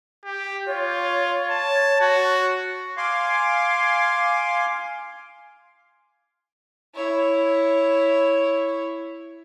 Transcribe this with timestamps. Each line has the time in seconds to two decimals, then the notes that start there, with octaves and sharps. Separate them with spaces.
0.24 G4
0.67 F4 C#5
1.50 A5
2.00 F#4
2.97 F5 G#5 C6 D6
6.95 E4 C#5